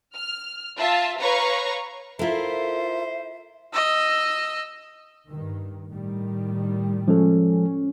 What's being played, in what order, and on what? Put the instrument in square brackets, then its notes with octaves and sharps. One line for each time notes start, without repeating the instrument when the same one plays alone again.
[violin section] F6
F4 E5 A5
B4 C#5 F5 A#5 C#6
[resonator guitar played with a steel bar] E4 A4 [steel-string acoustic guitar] F4 A#4 [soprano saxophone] C5 [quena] E5
[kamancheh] D#5 E6
[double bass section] G2 D#3
A2 D#3 G3
[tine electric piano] F3 G#3 A4 [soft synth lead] C#4